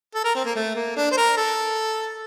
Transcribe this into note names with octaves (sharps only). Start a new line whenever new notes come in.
A4
A#4
C4
A#3
A3
A#3
D4
C5
A#4
A4